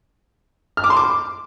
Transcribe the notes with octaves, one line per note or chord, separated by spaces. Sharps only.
F6
D6
C6
D6